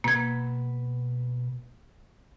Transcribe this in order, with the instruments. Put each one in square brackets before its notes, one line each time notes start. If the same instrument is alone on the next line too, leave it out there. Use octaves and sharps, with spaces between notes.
[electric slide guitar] B2 B4 [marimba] A#3 G#6